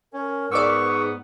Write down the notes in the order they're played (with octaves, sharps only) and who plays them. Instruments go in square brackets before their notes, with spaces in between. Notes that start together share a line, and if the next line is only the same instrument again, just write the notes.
[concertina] C#4 [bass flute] A#4
[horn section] G#2 B3 [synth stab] D5 D6 E6 [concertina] C#6